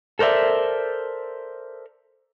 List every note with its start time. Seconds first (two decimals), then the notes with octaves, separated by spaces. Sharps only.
0.19 A4 A#4 C5 D5 E5